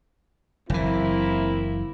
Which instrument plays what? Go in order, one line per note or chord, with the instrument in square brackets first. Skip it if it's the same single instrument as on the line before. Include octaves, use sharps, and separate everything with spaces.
[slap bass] F#1 E3 [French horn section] A#3 C4 E4